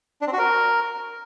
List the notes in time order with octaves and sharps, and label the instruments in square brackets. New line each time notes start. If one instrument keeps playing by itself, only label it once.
[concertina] D4
C4
F#4
A#4